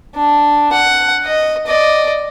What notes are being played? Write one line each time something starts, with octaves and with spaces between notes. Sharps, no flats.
D4
F#5
D#5
D5 D#5